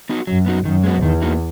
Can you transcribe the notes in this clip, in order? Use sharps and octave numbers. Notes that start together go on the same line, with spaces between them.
B3 D#4 F#4
F#2 F#3
B3 D#4 F#4
F#2 D#3
G#3 B3 F#4
E2 D#3
A#3 D#4 F#4